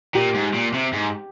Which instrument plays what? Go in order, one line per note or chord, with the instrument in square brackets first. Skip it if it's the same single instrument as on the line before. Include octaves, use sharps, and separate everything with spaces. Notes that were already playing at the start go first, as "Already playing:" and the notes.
[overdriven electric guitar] A#2 [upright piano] G4
[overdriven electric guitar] G#2
A#2
C3
G#2